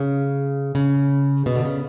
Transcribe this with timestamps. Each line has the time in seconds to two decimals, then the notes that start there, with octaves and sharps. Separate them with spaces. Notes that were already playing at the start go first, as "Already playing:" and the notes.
Already playing: C#3
0.75 C#3
1.46 B2
1.55 D3
1.65 C#3